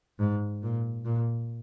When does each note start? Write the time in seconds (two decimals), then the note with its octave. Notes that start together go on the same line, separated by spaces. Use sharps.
0.19 G#2
0.63 A#2
1.05 A#2